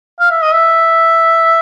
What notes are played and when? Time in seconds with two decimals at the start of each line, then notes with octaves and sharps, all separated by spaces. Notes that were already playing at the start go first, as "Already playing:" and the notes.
0.20 F5
0.31 E5
0.42 D#5
0.53 E5